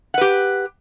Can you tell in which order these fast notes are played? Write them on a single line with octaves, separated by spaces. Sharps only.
F#5 B4 G4